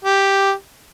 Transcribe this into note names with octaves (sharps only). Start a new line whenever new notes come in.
G4